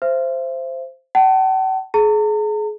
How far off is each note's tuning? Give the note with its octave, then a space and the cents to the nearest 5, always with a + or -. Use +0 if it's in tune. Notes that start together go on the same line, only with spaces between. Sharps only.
C5 +0 E5 +40
F#5 +45 A5 +0
G#4 +35 A#5 -40